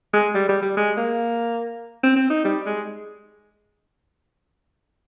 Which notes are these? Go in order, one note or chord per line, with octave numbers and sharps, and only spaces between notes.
G#3
G3
G3
G3
G#3
A#3
C4
C4
D#4
G3
G#3